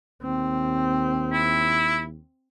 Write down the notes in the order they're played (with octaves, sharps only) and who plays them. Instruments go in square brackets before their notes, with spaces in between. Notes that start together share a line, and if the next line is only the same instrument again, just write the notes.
[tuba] D#2 [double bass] C4
[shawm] E4